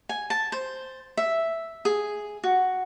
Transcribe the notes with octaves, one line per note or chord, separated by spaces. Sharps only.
G#5
A5
C5
E5
G#4
F#4